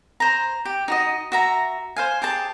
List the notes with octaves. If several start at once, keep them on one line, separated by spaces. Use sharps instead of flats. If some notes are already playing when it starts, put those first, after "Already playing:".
C5 A#5
G4
D#4 F#4 D#5
F#4 E5 A#5
C5 F5 G#5
G4 G#4 C5 A5